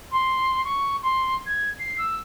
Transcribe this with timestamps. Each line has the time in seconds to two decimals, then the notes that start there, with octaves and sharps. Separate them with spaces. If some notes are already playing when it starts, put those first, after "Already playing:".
0.11 C6
0.64 C#6
1.03 C6
1.46 G#6
1.79 C7
1.98 E6